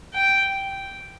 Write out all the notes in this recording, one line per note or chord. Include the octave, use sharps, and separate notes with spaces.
G5